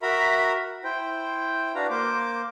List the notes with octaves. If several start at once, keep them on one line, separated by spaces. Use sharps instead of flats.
F#4 A#4 E5 A#5 B5
E4 C5 G5
D4 F#4 B4 F5 A#5
A#3 C5 D6